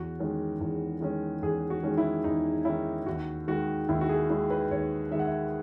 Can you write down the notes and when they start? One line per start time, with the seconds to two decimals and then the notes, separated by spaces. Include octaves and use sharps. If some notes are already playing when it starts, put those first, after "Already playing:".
Already playing: E2 F#4
0.19 D#3 G#3 C#4
0.60 E2
1.01 D#3 G#3 C#4
1.42 E2 G#4
1.70 F#4
1.83 D#3 G#3 C#4
1.98 E4
2.24 E2 D#4
2.65 D#3 G#3 C#4 E4
3.06 D#2 F#4
3.48 D#3 G#3 F#4
3.89 D#2 E4
4.01 F#4
4.09 G#4
4.30 D#3 G#3 E4
4.50 B4
4.71 D#2 C#5
5.11 D#3 G#3 E5
5.19 F#5
5.27 E5